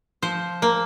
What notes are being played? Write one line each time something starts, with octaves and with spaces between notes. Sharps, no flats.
F3 C5
A#3